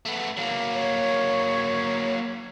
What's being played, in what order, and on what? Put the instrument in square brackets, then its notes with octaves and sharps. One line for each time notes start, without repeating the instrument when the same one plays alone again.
[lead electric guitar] A3 B3
F#3 A#3
[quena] C#5